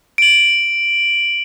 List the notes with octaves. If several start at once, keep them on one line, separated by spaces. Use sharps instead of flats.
D7 F#7